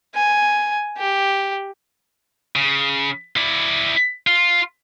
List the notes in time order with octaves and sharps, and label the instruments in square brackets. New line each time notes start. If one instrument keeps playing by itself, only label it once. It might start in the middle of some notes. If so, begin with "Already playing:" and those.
[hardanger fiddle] G#5
G4
[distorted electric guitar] C#3
E4 D5
F4